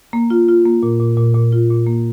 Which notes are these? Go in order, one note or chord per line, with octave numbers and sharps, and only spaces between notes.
A#3
F4
F4
A#3
A#2
A#2
A#2
A#2
F4
A#2
A#3